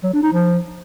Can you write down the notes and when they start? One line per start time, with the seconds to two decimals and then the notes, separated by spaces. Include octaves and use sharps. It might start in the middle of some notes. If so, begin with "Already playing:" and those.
0.03 F#3
0.13 D4
0.23 D#4
0.32 F3